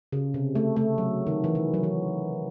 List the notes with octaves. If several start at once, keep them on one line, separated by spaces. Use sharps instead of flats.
C#3
C3
A3
A3
F#3
D#3
E3
D#3
F#3
E3